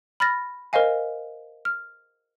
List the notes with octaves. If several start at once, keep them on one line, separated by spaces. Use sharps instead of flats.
B5 F6 A6 A#6
A#4 C5 D#5 F5 G#5
F6